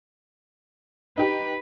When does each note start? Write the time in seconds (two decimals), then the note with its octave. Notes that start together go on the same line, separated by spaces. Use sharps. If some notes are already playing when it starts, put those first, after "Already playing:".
1.18 D#4 G4 B4